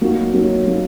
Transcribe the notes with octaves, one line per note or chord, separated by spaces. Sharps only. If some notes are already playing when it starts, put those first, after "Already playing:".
F#3 A#3 D#4 F#4
F#3 A#3 D#4 F#4
F#3 A#3 D#4 F#4